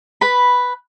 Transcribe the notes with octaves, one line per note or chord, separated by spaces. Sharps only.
B4 B5